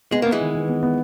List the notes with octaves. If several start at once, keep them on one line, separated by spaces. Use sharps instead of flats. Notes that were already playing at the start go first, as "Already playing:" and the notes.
G#3 B3
A#3 B3
E3 G#3
D#3
D#3
B3
B3